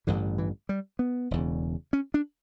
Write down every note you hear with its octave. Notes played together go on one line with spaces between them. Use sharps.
A1 G2 D3 E3
E3
G3
B3
E1 E2 C#3
C#4
D4